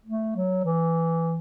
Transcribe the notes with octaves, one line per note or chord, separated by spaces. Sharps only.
A3
F#3
E3